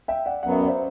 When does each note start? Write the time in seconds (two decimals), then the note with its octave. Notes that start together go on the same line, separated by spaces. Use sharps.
0.08 E5 G5
0.26 D5 F#5
0.43 F#2 F#3 B3 F#5
0.52 E5
0.61 D5
0.68 C5 E5